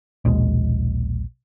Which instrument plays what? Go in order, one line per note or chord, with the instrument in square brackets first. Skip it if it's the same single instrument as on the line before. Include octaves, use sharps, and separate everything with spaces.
[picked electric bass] A#1 D#2 B2 G#3